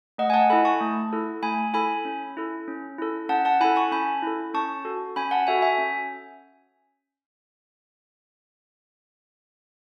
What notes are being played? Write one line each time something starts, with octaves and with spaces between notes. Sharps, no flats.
A3 D#5 F#5
G#5
F#5 A5
E4 A4 G#5 B5
A5 C#6
A3
E4 A4
A3 G#5 B5
E4 A4 G#5 B5
C#4
E4 A4
C#4
E4 A4
C#4 F#5 A5
F#5 A5
E4 A4 G#5 B5
A5 C#6
C#4 G#5 B5
E4 A4
C#4 A5 C#6
F#4 A4
C#4 G#5 B5
F#5 A5
F#4 A4 E5 G#5
E5 G#5
C#4